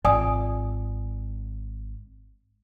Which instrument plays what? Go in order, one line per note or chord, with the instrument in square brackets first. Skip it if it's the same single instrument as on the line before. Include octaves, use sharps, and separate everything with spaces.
[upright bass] G#1 F4 [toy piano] D5 G#5 D#6